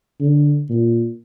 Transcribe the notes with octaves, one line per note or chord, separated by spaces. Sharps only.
D3
A#2